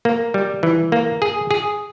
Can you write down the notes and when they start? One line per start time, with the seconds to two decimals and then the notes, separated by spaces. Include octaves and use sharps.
0.05 A#3
0.34 G3
0.63 E3
0.92 A#3
1.22 G#4
1.51 G#4